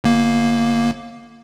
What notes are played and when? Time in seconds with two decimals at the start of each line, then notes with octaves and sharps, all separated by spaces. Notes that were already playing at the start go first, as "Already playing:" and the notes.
0.04 G1 A#3